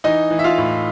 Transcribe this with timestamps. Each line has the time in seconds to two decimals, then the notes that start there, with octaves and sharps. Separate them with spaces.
0.04 E3 D#4 D#5
0.30 E3
0.39 E5
0.44 F4 F5
0.58 A2